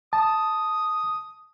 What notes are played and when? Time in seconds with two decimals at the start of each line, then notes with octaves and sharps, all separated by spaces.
0.13 A5 D#6